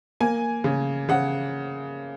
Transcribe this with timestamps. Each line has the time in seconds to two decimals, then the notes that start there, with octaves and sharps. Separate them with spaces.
0.20 A#3 G#5
0.64 C#3
1.09 C#3 F#5